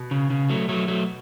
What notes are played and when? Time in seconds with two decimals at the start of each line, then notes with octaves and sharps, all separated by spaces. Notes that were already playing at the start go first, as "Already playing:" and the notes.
Already playing: B2
0.11 C#3
0.30 C#3
0.50 F#3 A3
0.69 F#3 A3
0.88 F#3 A3